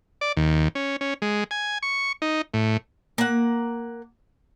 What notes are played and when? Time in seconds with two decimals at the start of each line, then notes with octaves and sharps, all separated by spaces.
0.21 D5
0.37 D#2
0.75 C#4
1.01 C#4
1.22 G#3
1.51 G#5
1.83 C#6
2.22 D#4
2.54 A2
3.18 A#3 F#5